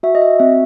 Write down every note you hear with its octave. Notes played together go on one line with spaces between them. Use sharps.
F#4 E5
D#5
E5
C4 E5